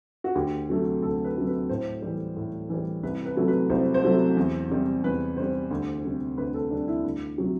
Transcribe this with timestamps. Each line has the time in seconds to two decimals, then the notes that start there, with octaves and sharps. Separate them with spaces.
0.24 F#4
0.35 D2 G4
0.70 C3 F#3 A3
1.02 D2 A4
1.25 B4
1.36 C3 F#3 A3
1.47 B4
1.69 A2 C5
2.02 E3 G3
2.37 A2
2.70 E3 G3
3.03 C2 B4
3.26 B4
3.36 C3 F#3 A3
3.48 B4
3.70 C2 C5
3.94 C5
4.04 C3 F#3 A3
4.37 E2
4.70 C3 G3
5.03 E2 B4
5.37 C3 G3 C5
5.71 D2
6.04 C3 G3
6.37 D2 B4
6.54 A4
6.71 C3 G3 D4
6.88 E4
7.04 D2
7.38 C3 F#3